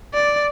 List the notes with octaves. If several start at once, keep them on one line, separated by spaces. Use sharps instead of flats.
D5